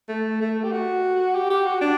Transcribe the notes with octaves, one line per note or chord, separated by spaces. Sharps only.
A3
A3
G4
F#4
G4
G4
F#4
D4